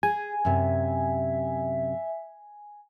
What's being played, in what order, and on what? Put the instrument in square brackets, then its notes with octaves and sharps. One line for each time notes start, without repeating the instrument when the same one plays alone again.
[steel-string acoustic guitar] G#4 [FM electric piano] G#5
[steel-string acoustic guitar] F#2 C3 [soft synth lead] E5